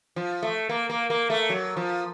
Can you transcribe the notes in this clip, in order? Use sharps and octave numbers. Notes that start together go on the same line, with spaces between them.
F3
A3
A#3
A#3
A#3
A3
F#3
F3